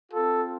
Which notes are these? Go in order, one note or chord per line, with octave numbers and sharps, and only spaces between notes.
C4 F4 A4